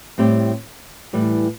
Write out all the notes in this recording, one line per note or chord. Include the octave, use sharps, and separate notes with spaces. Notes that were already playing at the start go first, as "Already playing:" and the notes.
A2 G3 C4 G4
A2 E3 G3